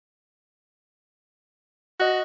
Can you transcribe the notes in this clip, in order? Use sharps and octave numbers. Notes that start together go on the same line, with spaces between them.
F#4 D#5 F#6